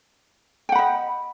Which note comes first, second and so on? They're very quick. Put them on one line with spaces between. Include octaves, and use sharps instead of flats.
G5 F#5 B5 D#5